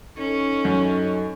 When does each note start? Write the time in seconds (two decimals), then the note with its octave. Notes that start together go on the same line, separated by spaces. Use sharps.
0.18 C#4 D#4 A4
0.65 F#2